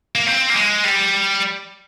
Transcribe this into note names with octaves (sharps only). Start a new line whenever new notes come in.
A#3
C4
A#3
G#3
G3